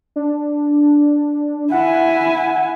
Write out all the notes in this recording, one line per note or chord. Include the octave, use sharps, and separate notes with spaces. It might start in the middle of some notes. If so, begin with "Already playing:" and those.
D4
E4 F#5 G#5